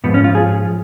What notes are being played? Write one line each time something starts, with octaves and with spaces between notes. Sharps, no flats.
G#2 F3 B3
C#4
F4
G#4